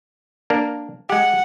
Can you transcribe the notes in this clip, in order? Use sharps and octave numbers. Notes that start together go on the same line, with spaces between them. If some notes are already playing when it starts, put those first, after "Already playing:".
A#3 D4 A#4
G#3 G4 F#5